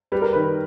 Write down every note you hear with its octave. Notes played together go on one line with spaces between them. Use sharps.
G3 B4
A#4
D#3 B4